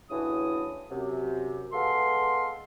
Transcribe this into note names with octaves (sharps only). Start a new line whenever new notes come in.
D2 A2 C#3 E3 E4 D#6
F#2 C3
G#3 B3 A4 F5 C6